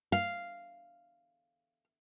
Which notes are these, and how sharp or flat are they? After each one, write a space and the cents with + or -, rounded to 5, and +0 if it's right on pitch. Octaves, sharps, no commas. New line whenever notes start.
F5 -5